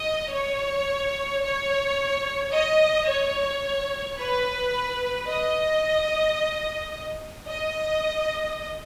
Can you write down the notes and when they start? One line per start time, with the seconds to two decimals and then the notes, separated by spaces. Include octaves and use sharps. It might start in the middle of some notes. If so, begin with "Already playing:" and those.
Already playing: D#5
0.32 C#5
1.43 C#5
2.52 D#5
3.08 C#5
4.18 B4
5.28 D#5
7.48 D#5